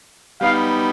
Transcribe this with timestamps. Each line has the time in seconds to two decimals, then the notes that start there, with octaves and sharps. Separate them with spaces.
0.41 G3 B3 D#4 F5